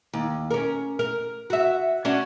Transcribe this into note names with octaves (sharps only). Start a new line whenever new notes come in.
D#2
C#4 A#4
A#4
F#4 E5
C#4 D4 F#4